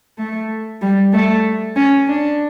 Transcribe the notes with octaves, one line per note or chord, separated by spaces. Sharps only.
A3
G3
A3
C#4
D4